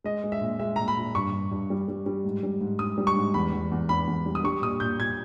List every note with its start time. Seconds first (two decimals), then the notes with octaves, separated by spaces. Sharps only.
0.04 G#3 D#5
0.24 G#3
0.32 E5
0.41 A#2
0.59 G#3 E5
0.76 A#2 A#5
0.88 B5
0.97 A#2
1.15 G2 C#6
1.32 G2
1.51 G2
1.70 G3
1.88 G3
2.06 G3
2.25 G#2
2.43 G3
2.61 G#2
2.79 G#2 D#6
2.98 G3
3.07 C#6
3.15 G#2
3.34 E2 B5
3.53 E2
3.72 E2
3.89 E2 B5
4.07 E2
4.26 G3
4.35 D#6
4.44 G3 C#6
4.62 A#2 D#6
4.80 A#2 G6
4.99 A#2 G#6